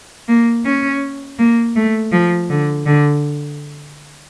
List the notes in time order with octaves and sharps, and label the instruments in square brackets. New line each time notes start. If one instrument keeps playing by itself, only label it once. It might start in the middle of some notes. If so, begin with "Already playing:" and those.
[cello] A#3
C#4
A#3
A3
F3
D3
D3